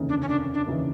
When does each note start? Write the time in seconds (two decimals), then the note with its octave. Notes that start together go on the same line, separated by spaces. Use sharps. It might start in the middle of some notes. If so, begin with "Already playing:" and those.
Already playing: F1 D#2 C#3 E3
0.09 D4
0.22 C#4
0.28 F1 D4
0.54 D4
0.67 D#2 C#3 E3